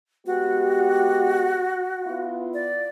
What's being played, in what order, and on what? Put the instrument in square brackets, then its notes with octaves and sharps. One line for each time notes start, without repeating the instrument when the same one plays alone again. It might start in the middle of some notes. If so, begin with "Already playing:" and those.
[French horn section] G#3 B3 G4 [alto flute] F#4
[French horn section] B3 E4 F4
[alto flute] D5